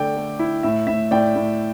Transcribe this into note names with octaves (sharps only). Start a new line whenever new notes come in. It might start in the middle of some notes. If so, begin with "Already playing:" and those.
Already playing: D3 A3 D5 G5 D6
A3
E4
A2 E5
A2 E5
A2 D5 G5
A2